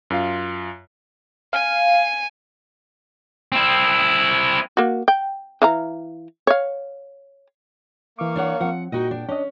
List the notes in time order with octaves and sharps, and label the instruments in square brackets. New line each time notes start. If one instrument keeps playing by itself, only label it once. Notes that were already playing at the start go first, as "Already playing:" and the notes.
[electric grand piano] F#2 F4 F5
[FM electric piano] F5 [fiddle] G#5
[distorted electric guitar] C4 E4
[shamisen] A#3 F#4
G5
E3 F5 A#5
C#5 F5
[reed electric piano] E3 D6 [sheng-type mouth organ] A#3 F5 C#6
[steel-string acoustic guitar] D4 C#5 F#5
[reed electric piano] F3 C4 [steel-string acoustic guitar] F#5
[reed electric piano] A#2 [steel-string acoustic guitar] D#4 F#4 D#5 [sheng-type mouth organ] G5
[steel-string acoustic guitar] D4
[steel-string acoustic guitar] C#4 [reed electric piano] D4 D#5